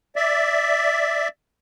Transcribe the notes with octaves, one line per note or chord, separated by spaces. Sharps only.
D5 E5